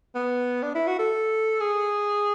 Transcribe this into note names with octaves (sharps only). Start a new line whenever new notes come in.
B3
D4
E4
F#4
A4
G#4